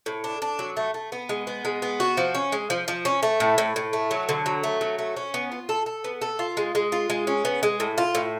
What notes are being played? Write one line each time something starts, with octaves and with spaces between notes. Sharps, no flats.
A2
D4
D4
F#3
A3
A3
B3
G#3
B3
G#3
B3
F#4
F3
C#4
G#3
F3
F3
C#4
A3
A2
A2
A2
A3
F#3
D3
F#3
A3
F#3
A3
C#4
B3
F4
A4
A4
B3
A4
F4
G#3
G#3
F4
G#3
C#4
B3
G#3
A2
F4
A2